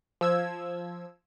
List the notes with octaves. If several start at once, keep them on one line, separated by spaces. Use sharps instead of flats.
F3 E6 G#6